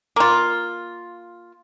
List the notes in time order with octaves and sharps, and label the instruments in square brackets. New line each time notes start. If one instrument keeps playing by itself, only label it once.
[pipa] A#3 F4